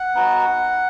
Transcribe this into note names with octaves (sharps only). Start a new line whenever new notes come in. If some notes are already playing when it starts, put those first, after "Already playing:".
Already playing: F#5
B3 D#4 F#4